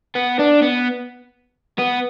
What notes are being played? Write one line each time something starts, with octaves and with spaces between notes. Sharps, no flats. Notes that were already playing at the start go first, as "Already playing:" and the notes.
B3
D4
B3
B3